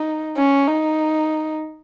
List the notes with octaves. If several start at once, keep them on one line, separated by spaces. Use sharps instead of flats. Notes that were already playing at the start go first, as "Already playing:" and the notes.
Already playing: D#4
C#4
D#4